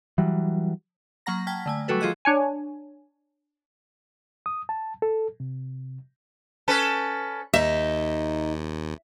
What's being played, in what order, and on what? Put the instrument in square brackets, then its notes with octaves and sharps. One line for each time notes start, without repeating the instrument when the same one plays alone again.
[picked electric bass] E3 F#3 G3
[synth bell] F#3 A#3 F#5 A#5 A#6
G5 A5 F6 G#6 B6
D3 A3 G#5
F#3 G3 A3 F#4 A4 B4
F3 F4 G#4 D#5 F#6
[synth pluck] D4 C#5 G#5
[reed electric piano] D#6
A5
A4
C3
[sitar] C#4 A4 B4
[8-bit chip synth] D#2 [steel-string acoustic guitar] D#4 [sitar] E5